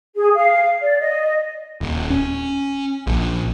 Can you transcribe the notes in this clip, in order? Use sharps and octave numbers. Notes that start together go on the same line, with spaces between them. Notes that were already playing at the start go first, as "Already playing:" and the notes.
G#4
F5
D5
D#5
D#1
C#4
A#1